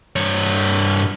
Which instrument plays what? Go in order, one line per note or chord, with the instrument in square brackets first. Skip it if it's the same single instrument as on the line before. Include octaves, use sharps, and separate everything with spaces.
[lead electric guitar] G2 C#5